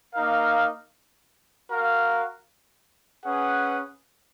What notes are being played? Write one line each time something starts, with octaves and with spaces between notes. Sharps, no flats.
A#3 D#4 A#4 F5
F#4 A#4 F5
C#4 G#4 B4 F#5